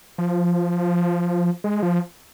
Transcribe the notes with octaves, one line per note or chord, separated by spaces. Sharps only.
F3
G#3
F3